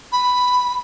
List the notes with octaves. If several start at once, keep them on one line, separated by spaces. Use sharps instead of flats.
B5